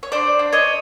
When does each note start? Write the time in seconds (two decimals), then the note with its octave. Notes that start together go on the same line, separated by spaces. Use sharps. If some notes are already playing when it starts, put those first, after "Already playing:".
0.03 C#5
0.12 D4 C5 D5
0.39 D4
0.53 C#5 D#5